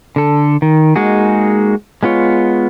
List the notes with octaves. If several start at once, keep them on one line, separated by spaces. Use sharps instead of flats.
D3 A4
D#3
G#3 A#3 D#4 F#4 G#4
G#3 B3 F4 C#5